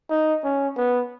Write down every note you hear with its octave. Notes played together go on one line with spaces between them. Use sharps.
D#4
C#4
B3